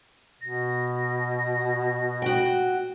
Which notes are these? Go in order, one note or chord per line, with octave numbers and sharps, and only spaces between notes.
B2 A#6
F#4 G5